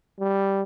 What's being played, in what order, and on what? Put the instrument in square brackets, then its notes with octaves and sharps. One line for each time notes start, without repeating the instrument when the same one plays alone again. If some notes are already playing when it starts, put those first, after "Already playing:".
[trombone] G3